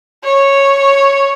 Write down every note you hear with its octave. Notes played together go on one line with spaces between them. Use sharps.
C#5